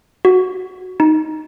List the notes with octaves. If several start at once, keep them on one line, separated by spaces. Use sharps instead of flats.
F#4
D#4